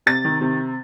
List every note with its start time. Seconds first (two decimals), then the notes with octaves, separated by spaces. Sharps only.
0.06 C3 A6
0.25 D#3
0.41 C3